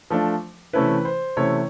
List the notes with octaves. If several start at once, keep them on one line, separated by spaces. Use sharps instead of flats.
F3 A3 D4
C3 E3 A3 C#4 E4 B4
C5
C3 E3 A3 C#4 E4 C#5